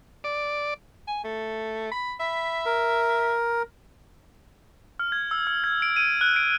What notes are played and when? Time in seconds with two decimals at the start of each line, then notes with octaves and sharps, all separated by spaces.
0.24 D5
1.07 G#5
1.24 A3
1.91 B5
2.20 E5 B5
2.66 A#4
4.99 F6
5.12 G#6
5.31 E6
5.47 F6
5.64 G#6
5.82 D7
5.96 D#7
6.21 F#6
6.36 D7